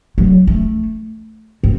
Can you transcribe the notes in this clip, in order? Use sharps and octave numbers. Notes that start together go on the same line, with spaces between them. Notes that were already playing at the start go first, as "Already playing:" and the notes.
F#3
A3
C4